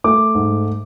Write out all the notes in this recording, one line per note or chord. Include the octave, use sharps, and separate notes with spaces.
A3 D6
G#2